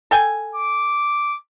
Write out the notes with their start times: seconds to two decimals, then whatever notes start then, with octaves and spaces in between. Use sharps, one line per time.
0.11 A4 G5 G#5
0.55 D6